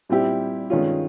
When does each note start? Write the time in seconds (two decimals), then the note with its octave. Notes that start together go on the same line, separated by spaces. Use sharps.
0.09 A#2 G3 C4 E4 G4
0.70 G2 D#3 G#3 C#4 F4